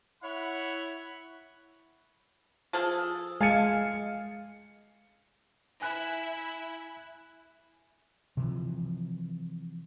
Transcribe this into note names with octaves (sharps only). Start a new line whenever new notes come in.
E4 C#5 F#5 B5
F3 G#4 A4
G#3 F5 G#5 A5 C#7
E4 G#5 F#6
C3 E3 F3